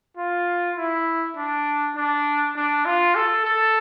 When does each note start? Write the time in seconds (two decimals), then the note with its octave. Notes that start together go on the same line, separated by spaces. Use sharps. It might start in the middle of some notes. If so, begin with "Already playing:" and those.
0.17 F4
0.77 E4
1.37 D4
1.96 D4
2.56 D4
2.85 F4
3.15 A4
3.45 A4